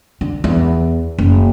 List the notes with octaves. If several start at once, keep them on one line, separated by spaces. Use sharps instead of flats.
D3
E2
F#1